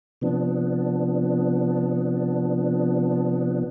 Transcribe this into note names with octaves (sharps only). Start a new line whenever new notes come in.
C3 F3 B3 D4